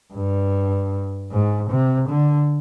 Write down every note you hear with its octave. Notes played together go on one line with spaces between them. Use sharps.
G2
G#2
C3
D3